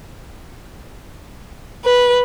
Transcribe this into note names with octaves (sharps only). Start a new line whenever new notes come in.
B4